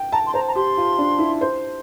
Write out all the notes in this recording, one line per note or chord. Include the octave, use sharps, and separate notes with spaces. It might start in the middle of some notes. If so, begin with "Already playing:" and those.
Already playing: G5
A5 A#5
C6
C5 A#5
A#5
G4 C6
F4
D4
E4
C5